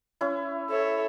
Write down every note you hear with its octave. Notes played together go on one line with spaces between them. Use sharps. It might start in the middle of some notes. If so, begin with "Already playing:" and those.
C#4 E4
A4 C#5 E5